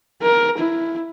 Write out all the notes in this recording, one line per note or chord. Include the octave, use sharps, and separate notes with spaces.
A#4
E4